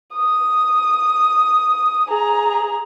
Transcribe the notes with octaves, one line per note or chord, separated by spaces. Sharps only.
D#6
G#4 A#5